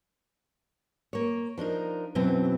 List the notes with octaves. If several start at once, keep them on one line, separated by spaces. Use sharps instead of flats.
A#3 C#5
F3 D4 D#4 A#4
F#2 B2 E3 F#3 C4